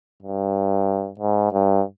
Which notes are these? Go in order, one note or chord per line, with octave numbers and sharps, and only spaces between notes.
G2
G#2
G2